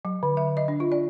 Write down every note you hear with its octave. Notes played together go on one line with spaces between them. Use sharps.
F#3
D3
E5
D#5
D4
F4
D5